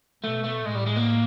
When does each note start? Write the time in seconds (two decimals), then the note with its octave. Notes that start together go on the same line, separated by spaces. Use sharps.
0.24 B2 A3
0.44 A3
0.65 A2 G#3
0.75 G3
0.86 G#3
0.96 A#3